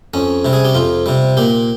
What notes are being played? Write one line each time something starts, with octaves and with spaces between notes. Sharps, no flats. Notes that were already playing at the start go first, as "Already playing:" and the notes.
F2 C#4
C3 G3
G#4
G4
F2 F4
C3 G3
A#2 G4